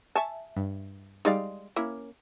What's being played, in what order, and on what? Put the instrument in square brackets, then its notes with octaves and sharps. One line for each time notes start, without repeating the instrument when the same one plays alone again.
[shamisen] E5 G#5 A5 [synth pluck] C#6
[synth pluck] G2
[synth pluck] G3 D#4 [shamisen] G#3 D5 F5
[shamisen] A#3 C#4 [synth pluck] E4